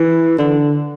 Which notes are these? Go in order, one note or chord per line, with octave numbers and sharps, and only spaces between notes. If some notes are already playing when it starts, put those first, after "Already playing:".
Already playing: E3
D3